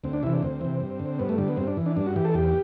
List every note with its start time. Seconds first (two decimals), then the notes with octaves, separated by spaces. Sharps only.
0.04 D2 C4
0.13 D4
0.23 C3 E3 E4
0.33 D4
0.43 D2 C4
0.61 C3 E3
0.80 G2
0.99 D3
1.19 G2 B3
1.29 A3
1.38 D3 G3
1.48 B3
1.57 G2 C4
1.67 D4
1.77 E3
1.86 D4
1.96 G2 D4
2.06 F#4
2.16 E3 G4
2.25 A4
2.34 E2 G4